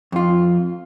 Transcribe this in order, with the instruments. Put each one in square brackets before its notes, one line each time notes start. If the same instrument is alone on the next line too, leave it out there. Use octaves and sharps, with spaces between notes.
[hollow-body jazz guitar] F2 F4